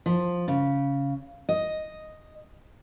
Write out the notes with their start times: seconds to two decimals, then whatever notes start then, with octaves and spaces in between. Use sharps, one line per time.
0.06 F3
0.48 C#3
1.49 D#5